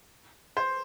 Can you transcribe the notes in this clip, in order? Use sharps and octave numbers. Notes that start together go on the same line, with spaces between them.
C5